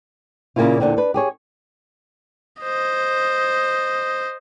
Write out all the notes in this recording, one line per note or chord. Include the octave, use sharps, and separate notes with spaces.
A#2 C#3 A#3 C#4 E4 F4
E2 G2 A#2 D3 A#3 C4
D4 B4
G4 G#4 C#5
C5 D#5